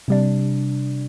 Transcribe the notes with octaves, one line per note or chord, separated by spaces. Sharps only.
C3 G3 D4